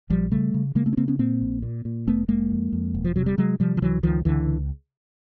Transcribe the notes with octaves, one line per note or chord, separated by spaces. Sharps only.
A#1 F3 G3
C#3 G3 A3
C#3
C#3 G#3 A#3
A3 B3
C#4
C#3 A#3 C4
B3 C#4
A#2 A#3 C4
A#1
A#2
A#2
F1 A3 B3
F1 G#3 A#3
F2
F2
E1
F3
C3 F#3
G3
C3 F#3 G#3
C3 F3 G3
F3
C#2 E3 F#3
C#2 D#3 F3
C#2 D3 E3